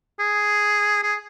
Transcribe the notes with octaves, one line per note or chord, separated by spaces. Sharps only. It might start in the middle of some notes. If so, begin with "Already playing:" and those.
G#4
G#4